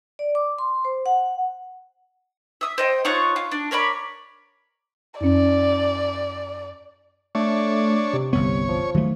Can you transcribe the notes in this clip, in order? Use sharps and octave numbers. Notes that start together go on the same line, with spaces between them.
D5
D6
C6
C5
F#5
E5 D#6
C5 D#5 G5
D#4 F4 C#5 F#5
F4
D4
A#4 C#5 D5 B5
F#2 C#4 D5
A3 D4 C#5
C3
G1 C2 B3 C#5
F3
D#3 F#3 A3